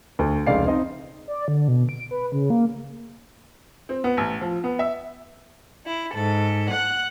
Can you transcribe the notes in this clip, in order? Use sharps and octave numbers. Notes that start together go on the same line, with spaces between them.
D2
F1 C#2 C#3 D5 F5 C7
C4 D#4 D#5
D5
D3
B2
D7
B4
C#3
A#3
C4
B3
A1
F3
B3
E5
E4
G#2 A4
F#5 F#6